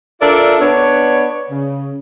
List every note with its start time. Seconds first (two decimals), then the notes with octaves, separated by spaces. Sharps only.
0.21 D4 F4 A4 A#4 D5 E5
0.61 B3 D4 C#5
1.50 C#3